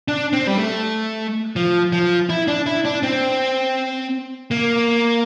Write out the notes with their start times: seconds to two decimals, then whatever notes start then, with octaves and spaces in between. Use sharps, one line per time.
0.08 D4
0.33 C4
0.47 G3
0.58 A3
1.56 F3
1.92 F3
2.29 E4
2.48 D4
2.66 E4
2.85 D4
3.03 C4
4.51 A#3